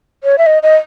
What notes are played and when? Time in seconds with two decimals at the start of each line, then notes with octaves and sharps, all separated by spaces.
0.24 C#5
0.38 E5
0.46 D#5
0.63 D#5